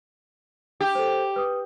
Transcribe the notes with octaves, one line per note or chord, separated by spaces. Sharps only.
G4
A4 C5
B4 D#6